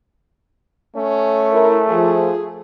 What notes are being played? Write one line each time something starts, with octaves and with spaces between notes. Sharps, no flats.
A3 C#4
E4 A#4
F3 G#4